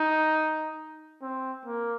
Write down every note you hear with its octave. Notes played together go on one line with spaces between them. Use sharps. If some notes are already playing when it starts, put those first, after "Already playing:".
Already playing: D#4
C4
A#3